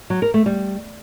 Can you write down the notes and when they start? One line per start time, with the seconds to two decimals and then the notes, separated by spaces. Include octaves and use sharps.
0.10 F#3
0.22 A#4
0.34 A3
0.46 G3